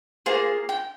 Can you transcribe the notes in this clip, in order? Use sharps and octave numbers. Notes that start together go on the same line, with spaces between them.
A#3 F4 G#4 C5
G5